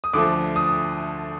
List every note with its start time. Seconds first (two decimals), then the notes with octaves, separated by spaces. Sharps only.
0.04 D#6
0.13 D2 D3 F3 A3 D6
0.56 D#6